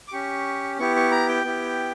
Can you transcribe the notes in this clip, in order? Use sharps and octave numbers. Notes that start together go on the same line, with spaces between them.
D6
C#4 G4 C#6
B3 E4 G4 C#6
C#6
A#5
G5
B3 E4 G4